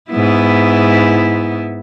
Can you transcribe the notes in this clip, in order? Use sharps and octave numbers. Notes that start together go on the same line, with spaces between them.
G#2 B3 E4